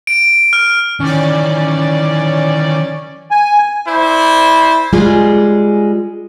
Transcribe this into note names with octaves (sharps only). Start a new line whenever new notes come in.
D7
F6
D#3 E3 C#4 D5
G#5
E4 C5 D5
G3 G#3 F4 G#4